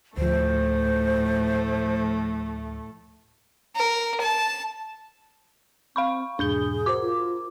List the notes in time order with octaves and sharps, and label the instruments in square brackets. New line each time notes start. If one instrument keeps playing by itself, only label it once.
[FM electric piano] D2 F3 [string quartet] A2 A3 [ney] C5
[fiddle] A#4
A5
[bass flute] C4 [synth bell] F5 B5 C#6
[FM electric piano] E2 G#2 B2 [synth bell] D4 G6 G7 [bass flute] G#4
[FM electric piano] F#4 A#4 C5 [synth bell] D6
[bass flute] F4